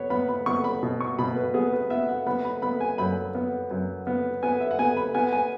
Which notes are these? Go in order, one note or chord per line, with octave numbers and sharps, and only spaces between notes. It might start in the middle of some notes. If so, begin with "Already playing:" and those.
Already playing: B3 C#5
B3 B5
B5
B3 C#6
B5
B2
C#6
B2 B5
B4
B3 G#4
B4
B3 E5
F#5
B3 B5
B5
B3 B5
G#5
F#2 B5
B3
F#2
B3
B3 G#5
E5
F#5
B3 G#5
B5
B3 G#5
G#5